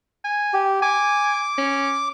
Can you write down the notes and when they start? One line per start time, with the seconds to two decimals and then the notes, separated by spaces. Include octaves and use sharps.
0.24 G#5
0.54 G4
0.82 G#5 D6
1.58 C#4